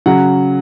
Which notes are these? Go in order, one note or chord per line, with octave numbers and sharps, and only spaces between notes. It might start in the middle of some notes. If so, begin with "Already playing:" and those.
C#3 F#3 F#5